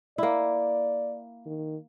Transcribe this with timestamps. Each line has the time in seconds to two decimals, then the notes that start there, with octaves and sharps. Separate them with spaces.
0.18 A#3 E4 D5
1.46 D#3